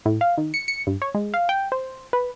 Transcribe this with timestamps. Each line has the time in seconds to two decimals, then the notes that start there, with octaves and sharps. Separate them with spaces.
0.06 A2
0.21 F5
0.38 D#3
0.54 C#7
0.68 C#7
0.87 G2
1.02 C#5
1.15 G#3
1.34 F5
1.49 G5
1.72 C5
2.13 B4